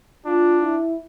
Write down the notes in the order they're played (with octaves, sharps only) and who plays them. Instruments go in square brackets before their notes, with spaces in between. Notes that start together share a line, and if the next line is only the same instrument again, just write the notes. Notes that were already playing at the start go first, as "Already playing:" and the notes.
[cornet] D4 [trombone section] F4
[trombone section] E4